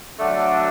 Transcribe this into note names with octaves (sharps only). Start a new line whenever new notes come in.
D3 F#3 A3 D4